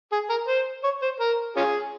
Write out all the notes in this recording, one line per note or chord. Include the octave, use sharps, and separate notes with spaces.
G#4
A#4
C5
C#5
C5
A#4
C#4 F4 G#4